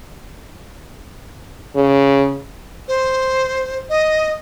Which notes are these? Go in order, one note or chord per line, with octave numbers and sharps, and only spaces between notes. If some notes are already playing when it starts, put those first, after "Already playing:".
C#3
C5
D#5